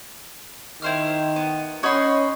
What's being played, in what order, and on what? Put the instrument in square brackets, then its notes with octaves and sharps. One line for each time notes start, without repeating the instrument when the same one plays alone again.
[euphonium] D#3 [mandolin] E4 C5 F6
[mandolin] B3
[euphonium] C#4 [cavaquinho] D#4 D#5 F#5 [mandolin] C#5 B5 C6